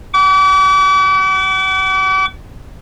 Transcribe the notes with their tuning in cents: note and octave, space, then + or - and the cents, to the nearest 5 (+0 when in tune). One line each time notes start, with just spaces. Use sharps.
F#5 +40 D6 -40